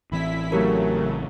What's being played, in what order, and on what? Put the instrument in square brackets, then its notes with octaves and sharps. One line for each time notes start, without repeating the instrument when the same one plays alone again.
[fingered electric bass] A1 E3 C4 [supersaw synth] E4 B6
[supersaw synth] C#3 F#3 A3 [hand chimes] G4 A#4